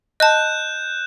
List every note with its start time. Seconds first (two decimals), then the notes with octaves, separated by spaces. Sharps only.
0.20 D#5 A5 F#6 G6 E7